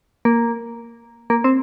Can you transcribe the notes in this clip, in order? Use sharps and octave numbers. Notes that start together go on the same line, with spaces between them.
A#3
A#3
C4